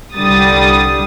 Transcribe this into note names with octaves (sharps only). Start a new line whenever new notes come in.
C2 D3 G3 D#6 A6